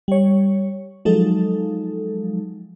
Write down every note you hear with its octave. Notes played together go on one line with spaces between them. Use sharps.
G3 C#5
F3 F#3 G#3 D#4 A4